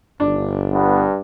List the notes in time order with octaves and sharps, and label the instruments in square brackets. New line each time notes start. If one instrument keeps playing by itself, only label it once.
[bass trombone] G1 [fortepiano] D4
[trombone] G2 [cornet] B3